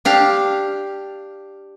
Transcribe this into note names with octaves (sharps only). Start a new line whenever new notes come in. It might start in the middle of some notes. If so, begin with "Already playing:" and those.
D4 G4 F5